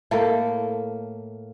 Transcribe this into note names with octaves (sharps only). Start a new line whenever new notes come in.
A2 A3 A#3 A4